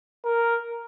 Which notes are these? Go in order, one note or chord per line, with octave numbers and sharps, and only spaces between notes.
A#4